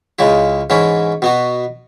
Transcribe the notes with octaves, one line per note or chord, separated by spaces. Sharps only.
C#2 C#3 G#3 E4
G#2 E3 C#4 E4
B2 B3 F#4